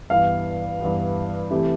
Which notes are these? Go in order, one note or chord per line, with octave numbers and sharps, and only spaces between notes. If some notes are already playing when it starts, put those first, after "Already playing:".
G2 E3 B3 F5
G2 E3 B3
C3 E3 A3 E4 G4